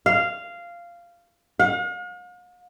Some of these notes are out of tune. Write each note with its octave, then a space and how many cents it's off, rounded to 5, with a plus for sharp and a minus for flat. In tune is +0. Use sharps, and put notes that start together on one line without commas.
F5 -10
F5 +45